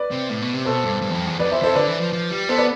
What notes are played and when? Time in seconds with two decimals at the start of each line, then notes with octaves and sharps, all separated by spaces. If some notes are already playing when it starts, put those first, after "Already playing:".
Already playing: B4 D5
0.11 C3
0.30 A2
0.42 B2
0.54 C3
0.65 B2 A4 C5
0.84 G2
1.02 G2
1.10 E2
1.15 F2
1.27 E2
1.39 F2 B4 D5
1.52 E2 C5 E5
1.63 F2 A4 C5
1.75 D3 B4 D5
1.88 E3
2.00 F3
2.13 F3
2.31 G3
2.49 B3 A4 C5
2.58 B4 D5